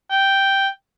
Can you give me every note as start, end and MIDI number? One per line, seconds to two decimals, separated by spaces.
0.11 0.68 79